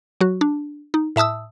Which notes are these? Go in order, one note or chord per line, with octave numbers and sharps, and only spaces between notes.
F#3 F#4
D4
D#4
A2 E5 A5 D#6 E6